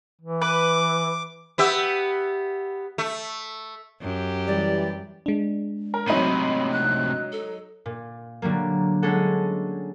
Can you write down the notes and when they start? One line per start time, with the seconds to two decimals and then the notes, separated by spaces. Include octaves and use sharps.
0.22 E3
0.42 B4 D6
1.58 B3 G4 E5
2.98 A3
4.01 F#2 G4
4.47 E3 G3 D5
5.26 G#3 D4
5.94 A#4
6.08 A2 C3 F#3 D#4 B5 D#7
6.72 F#6
7.32 A4
7.86 A#2
8.42 D3 F#3 G3 A#3
9.02 G#3 C#4 D4 G#4 A4 F#5